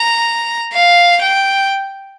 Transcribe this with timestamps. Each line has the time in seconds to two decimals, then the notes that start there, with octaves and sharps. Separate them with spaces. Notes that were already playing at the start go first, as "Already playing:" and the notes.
Already playing: A#5
0.73 F5
1.22 G5